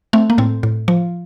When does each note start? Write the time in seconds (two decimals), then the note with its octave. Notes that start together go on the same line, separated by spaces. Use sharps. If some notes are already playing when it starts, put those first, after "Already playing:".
0.13 A3 C4
0.30 A#3
0.38 A2 C4
0.63 A2
0.88 F3